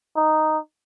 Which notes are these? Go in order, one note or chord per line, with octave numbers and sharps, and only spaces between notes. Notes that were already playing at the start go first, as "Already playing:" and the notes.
D#4